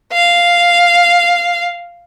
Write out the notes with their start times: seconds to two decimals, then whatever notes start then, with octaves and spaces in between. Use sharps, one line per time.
0.13 F5